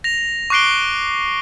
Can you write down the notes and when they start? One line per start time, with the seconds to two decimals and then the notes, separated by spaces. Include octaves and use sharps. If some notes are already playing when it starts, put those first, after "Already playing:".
0.04 A#6 F7
0.50 C#6 D6 F#6 C7 D7 G7